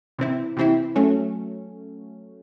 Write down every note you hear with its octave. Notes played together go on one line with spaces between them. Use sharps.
C3 E3 C4 E4
C3 E3 C4 E4
F#3 A3 C#4